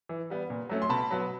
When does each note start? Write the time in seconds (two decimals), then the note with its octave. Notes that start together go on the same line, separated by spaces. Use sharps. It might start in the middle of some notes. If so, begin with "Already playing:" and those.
0.09 E3
0.30 G3 B3
0.50 A#2
0.69 F#3 A3 C#4
0.82 C6
0.89 B2 A5 B5
1.11 F#3 B3